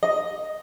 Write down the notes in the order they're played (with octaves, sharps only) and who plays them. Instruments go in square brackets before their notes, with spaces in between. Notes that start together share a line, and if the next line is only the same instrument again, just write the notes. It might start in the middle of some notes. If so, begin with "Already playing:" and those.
[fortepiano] D#5